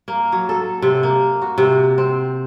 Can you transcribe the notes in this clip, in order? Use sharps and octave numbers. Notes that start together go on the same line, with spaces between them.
A#3
F#3
A4
C3
A#3
F#4
C3
C4